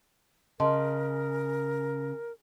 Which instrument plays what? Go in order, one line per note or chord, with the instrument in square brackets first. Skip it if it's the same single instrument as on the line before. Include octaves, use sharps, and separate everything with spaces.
[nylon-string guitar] C#3 [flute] A#4 [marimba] D#5 A5 C6